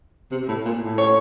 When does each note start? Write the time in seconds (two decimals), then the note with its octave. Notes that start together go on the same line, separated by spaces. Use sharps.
0.31 C3
0.48 A2
0.65 A#2
0.82 A2
0.98 C#5